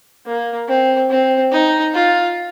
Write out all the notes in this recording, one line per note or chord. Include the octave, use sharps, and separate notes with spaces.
A#3
C4
C4
D#4
F4